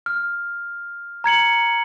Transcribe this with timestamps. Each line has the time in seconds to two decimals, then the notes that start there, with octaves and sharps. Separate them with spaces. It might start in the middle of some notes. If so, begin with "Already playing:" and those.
0.06 F6
1.24 A#5 G#6 C#7 F#7